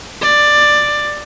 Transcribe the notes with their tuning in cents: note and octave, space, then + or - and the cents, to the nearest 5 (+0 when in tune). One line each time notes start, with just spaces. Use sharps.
D5 +10